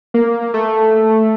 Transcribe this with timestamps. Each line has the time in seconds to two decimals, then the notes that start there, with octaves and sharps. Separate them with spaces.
0.14 A#3
0.54 A3